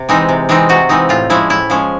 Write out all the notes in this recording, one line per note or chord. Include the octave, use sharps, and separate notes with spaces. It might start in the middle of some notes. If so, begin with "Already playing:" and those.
Already playing: C3
E3 G#3 C4 D#4
C3
E3 G#3 C4 D#4
C3 F#4
E3 G#3 C4 D#4
A2 F4
F3 G#3 C#4 E4
A2 E4
F3 G#3 C#4